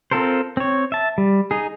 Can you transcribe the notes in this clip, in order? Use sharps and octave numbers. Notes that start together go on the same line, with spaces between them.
C4 F4 A4 A#4 C5
C4 C#5
E5 A5
G3
D#4 G#4